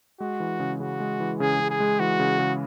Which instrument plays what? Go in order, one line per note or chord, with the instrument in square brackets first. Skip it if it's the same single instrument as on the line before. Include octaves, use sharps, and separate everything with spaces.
[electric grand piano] G#3 [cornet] F#4
[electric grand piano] E3
C#3
[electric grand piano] C#3 [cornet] F#4
[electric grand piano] G#3
E3
[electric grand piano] C#3 [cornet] G#4
[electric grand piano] C#3
[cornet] G#4
[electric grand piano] G#3
[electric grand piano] E3 [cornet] F#4
[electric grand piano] C#3
C#3